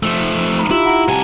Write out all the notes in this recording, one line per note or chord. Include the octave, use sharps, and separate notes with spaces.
F3 A3
D#4 A#5 B5
E4 F4 G4
F#5 A#5
C2 G4 G#5 A5